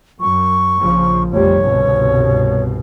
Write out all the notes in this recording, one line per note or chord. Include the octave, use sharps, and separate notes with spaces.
F#2 C#6
A#1 C#3 F3
F1 C3 G3 C#5
G1 C2 B2